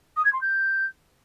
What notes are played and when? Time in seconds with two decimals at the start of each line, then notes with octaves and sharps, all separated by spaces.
0.16 D#6
0.25 G#6
0.33 C6
0.41 G6